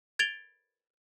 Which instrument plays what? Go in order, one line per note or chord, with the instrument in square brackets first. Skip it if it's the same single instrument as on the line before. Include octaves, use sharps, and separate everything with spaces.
[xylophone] G#6 A6 D7 F7 G7